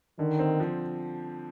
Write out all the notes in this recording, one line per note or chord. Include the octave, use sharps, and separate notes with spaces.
D3 D#3
C4
F3